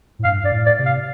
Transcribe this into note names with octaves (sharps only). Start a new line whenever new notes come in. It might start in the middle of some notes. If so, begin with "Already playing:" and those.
A2
G2 F5
G2 D5
A2
D5
C3
F5